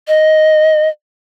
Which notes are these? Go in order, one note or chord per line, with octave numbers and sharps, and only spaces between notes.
D#5